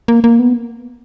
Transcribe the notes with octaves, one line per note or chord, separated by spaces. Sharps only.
A#3
A#3
B3